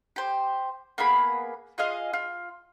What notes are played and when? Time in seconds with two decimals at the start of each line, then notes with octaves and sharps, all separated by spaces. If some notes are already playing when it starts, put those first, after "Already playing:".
0.16 G4 C5
0.98 A#3 B3 G#4 B5
1.78 F4 G#4 D#5 F5
2.13 F4